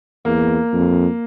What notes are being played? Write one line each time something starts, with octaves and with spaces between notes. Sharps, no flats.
E2 A#3
F2